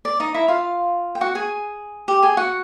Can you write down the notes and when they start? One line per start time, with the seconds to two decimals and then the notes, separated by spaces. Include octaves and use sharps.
0.05 D5
0.20 D#4 D#5
0.34 E4 E5
0.48 F4 F5
1.15 G5
1.21 F#4 F#5
1.35 G#4 G#5
2.08 G4 G5
2.22 G#4 G#5
2.37 F#4 F#5